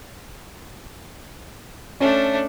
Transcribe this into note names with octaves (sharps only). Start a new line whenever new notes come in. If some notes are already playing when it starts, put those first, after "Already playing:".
A3 C#4 D4